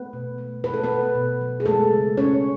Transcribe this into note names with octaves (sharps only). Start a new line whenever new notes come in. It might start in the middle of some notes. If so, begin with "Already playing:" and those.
Already playing: A3 B3 B4
B2
A3
A3 B4
A4
B3 B4
B2
B2
F#3
G#4
G#3 A3 A4
C#3
C#3 C#4 C#5